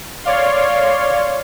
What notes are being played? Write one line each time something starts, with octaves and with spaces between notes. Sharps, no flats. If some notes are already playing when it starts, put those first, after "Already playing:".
C#5 D5 F5 C6